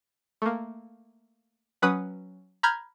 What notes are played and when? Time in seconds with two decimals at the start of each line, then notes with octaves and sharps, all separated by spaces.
0.42 A3 A#3
1.82 F#3 C#4 B4 F#5 D#6
2.63 A#5 B5 F6 G6 G#6